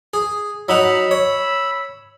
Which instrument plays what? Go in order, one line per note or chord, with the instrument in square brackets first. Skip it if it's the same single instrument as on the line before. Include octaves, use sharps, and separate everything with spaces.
[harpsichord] G#4
[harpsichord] F#3 D#4 F#5 [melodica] B5 E6
[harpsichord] C#5